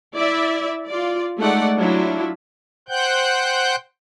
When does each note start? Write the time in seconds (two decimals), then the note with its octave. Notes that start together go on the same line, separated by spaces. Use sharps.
0.15 E4 D5 E5
0.87 F4 D5
1.40 G#3 A3 D#4 D5 F#5
1.78 F#3 D4 E4 F4
2.89 C5 F#5 G5 F#6 G6